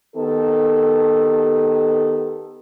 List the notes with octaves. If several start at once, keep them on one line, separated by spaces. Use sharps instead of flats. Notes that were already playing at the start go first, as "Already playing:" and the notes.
D#3 B3 G4 A4